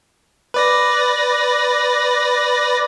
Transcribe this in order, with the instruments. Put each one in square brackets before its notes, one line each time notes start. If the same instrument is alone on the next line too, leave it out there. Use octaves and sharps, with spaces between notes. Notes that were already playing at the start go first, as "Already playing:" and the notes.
[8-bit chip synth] B4 D5 A#6